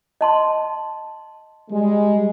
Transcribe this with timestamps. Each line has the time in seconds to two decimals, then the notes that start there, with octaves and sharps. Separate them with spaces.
0.21 D#5 A5 C6
1.70 G3 G#3